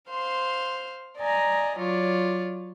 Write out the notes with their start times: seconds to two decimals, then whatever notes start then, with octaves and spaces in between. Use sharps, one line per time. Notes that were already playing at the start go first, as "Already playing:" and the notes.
0.10 C5 F5 C6
1.17 D5 D#5 G#5 A#5
1.77 F#3 F4 C#5 D5